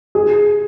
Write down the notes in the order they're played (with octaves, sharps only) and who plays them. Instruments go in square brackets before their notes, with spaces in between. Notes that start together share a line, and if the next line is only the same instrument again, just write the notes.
[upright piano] G#4